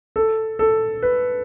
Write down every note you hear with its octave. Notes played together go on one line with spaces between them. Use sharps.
A4
A4
B4